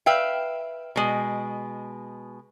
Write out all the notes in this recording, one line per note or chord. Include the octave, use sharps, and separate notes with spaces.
B4 E5 F5 G5
B2 G#3